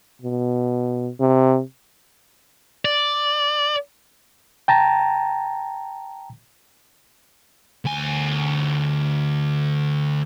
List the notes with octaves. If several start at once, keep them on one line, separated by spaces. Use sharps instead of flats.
B2
C3
D5
G5 A5 A#5
D2 G#5